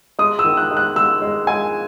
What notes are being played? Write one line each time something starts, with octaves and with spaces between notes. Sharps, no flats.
G#3 D#6
E6
D#3
F#6
G#3
F#6
G#3 E6
G#3
G#3 G#5